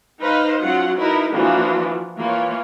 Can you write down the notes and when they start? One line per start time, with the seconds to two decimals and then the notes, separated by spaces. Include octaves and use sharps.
0.21 D#4 B4 C5 D#5 F5
0.61 F#3 C#4 F4 F#5
0.98 D#4 E4 A#4 B4
1.35 E3 F3 A#3 D4 F4 F#4
2.18 E3 A#3 F4 C#5